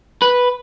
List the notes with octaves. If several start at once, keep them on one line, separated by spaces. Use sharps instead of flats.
B4